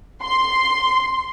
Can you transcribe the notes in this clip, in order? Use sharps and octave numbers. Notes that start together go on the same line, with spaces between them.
C6